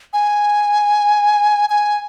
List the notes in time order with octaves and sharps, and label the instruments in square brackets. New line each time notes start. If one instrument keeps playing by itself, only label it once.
[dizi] G#5
G#5